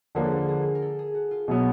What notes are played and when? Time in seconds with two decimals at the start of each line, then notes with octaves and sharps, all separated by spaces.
0.15 D3 F3 A#3 D4 G#4
0.24 A4
0.31 G#4
0.48 G#4
0.75 A#4
0.82 A4
0.99 G#4
1.14 F#4
1.31 F4
1.48 B2 F#3 B3